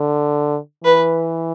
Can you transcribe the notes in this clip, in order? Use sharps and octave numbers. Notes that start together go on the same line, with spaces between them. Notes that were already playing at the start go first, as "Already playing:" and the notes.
Already playing: D3
E3 B4